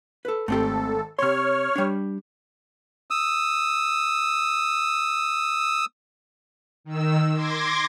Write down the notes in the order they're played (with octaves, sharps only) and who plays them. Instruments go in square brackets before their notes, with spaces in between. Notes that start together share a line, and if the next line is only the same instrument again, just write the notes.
[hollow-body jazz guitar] A4 B4
[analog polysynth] G#1 A4 [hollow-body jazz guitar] A3 C4 G4
[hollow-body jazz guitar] C3 C6 [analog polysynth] C#5 F6
[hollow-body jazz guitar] G3 D4
[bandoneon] D#6 E6
[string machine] D#3 E6
C6 D6 G#6 A#6